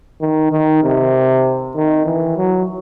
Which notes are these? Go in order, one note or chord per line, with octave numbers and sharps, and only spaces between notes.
D#3
D#3
C3
D#3
E3
F#3